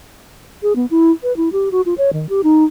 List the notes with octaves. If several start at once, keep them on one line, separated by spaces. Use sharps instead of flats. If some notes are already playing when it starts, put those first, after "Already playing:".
G#4
B3
E4
B4
E4
G4
F#4
F4
C#5
D#3
G4
D#4